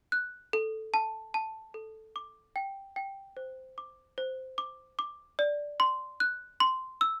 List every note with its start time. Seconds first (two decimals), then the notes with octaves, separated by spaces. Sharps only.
0.12 F#6
0.53 A4
0.94 A5
1.34 A5
1.74 A4
2.16 D6
2.56 G5
2.96 G5
3.37 C5
3.78 D6
4.18 C5
4.58 D6
4.99 D6
5.39 D5
5.80 C6
6.20 F#6
6.60 C6
7.01 E6